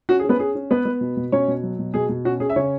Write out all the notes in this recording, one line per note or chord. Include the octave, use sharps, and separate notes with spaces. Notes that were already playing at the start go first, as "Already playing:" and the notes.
C#4 F#4
G#4
C#4
B3 B4
C#4 G#4
C#4
B3 B4
B3
B2
B2
B2 C#4 C#5
B2
F#3
B2
B2 G#4
B2
C#4 F#4
C#4 G#4
E5
C#3 C#4 C#5